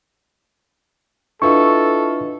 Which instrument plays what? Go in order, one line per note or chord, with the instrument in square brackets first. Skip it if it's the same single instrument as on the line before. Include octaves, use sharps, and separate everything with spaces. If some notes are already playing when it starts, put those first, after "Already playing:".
[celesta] D4 B4 D#5 [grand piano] E4 F4 [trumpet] A4 [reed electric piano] C#6